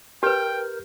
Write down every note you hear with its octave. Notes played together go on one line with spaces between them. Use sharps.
G4 A#4 B4 G5 F6 G6